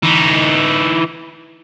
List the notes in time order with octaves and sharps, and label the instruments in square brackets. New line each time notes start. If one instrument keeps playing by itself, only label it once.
[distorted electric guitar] E3 D#4